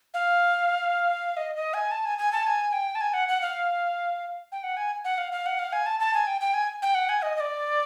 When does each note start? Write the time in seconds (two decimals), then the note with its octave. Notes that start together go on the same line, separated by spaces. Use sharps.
0.14 F5
1.37 D#5
1.55 D#5
1.74 G#5
1.91 A5
2.05 G#5
2.18 G#5
2.32 A5
2.47 G#5
2.73 G5
2.95 A5
3.01 G#5
3.13 F#5
3.28 F#5
3.42 F5
4.52 G5
4.63 F#5
4.77 G#5
5.05 F#5
5.18 F5
5.32 F5
5.46 F#5
5.59 F5
5.73 G#5
5.86 A5
6.00 A5
6.14 G#5
6.27 G5
6.41 G5
6.54 G#5
6.82 G5
6.95 F#5
7.09 G#5
7.22 D#5
7.36 D#5
7.40 D5